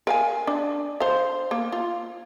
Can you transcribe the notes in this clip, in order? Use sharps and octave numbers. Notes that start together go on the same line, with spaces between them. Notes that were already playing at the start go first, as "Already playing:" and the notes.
A#4 F5 G#5
D4
C5 F5
A#3
F4